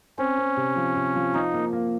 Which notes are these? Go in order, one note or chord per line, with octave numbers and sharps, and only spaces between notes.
C4 C#4
C4
C3
F3
C3
F3
F3 D#4
A#3
A#3